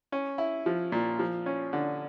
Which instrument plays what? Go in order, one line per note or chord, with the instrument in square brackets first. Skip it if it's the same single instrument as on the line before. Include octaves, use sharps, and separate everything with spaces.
[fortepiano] C#4
E4
F3
A#2
F3
C#4
D3